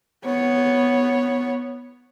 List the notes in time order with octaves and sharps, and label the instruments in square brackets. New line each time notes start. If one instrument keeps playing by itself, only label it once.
[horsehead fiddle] B3 C#5